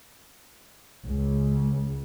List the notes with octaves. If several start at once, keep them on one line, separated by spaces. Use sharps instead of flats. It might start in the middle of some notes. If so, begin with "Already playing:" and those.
C#2